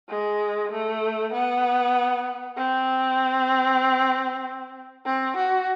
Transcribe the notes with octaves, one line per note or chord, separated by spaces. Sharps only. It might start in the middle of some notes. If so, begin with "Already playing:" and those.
G#3
A3
B3
C4
C4
F#4